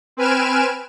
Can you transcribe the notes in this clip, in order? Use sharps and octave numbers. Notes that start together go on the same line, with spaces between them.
C4 B4 G#5 F6 D7 E7